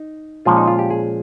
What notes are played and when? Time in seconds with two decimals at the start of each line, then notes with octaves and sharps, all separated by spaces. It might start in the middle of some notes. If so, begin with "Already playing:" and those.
Already playing: D#4
0.45 A#2 F3 G#3 C#4 F4
0.57 D#4
0.67 F4
0.79 G4
0.90 G#4